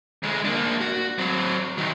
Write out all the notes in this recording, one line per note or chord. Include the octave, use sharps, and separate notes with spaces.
D2 G#3
A#3 D4
F#4
F#3 C4
D#3 F#3